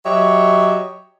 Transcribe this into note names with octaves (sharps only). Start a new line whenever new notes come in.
F#3 G4 C#5 D#5 E5